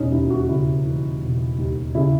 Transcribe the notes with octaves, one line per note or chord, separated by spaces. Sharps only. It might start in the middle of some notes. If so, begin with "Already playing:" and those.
Already playing: E1 C#4 D#4
D#2 E4
F#4
C#3 E4
E3
E1
D#2
C#3 E4